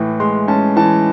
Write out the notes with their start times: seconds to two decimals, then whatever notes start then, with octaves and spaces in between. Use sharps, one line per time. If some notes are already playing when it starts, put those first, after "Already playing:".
Already playing: A2 E3
0.20 G#3 C6
0.48 C#4 A5
0.76 E3 A5